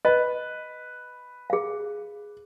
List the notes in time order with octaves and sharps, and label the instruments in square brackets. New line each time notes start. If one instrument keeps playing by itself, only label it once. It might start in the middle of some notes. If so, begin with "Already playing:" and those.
[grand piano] B4 [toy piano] D#5
[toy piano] G#4 F5